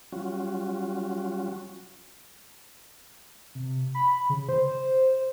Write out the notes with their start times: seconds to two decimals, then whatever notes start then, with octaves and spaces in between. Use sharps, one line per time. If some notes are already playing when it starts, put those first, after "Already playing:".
0.12 F#3 G3 C#4 F4 F#4
3.55 C3
3.95 B5
4.30 C#3
4.49 C5